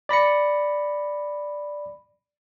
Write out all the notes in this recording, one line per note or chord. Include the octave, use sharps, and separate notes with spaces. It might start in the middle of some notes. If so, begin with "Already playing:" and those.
D5 B5 A#6 C#7